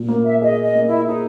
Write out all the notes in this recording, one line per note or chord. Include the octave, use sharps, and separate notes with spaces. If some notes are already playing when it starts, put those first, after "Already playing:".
Already playing: A#2
A#3
E5
G#4 D#5
D#5
A#3
E4
D#4 G#4